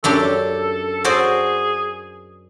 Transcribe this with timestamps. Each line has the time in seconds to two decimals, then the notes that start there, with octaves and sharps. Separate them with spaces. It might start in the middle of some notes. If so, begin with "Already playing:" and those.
0.04 F#2 D4 G4 A4
1.04 F#4 G#4 C5 D5